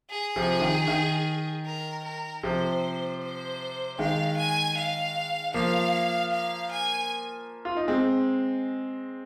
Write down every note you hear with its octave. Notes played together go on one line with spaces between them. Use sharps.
G#4
C3 F3
D#3
D#3
A#4
A#4
C3 F3 C5
C5
D#3 G#3 F5
G#5
F5
F3 A#3 F5
F5
G#5
F4
D#4
G#3 C4